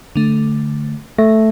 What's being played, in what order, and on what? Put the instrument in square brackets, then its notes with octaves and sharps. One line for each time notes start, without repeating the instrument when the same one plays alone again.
[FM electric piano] D3 A3
[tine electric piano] A3 [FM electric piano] A#6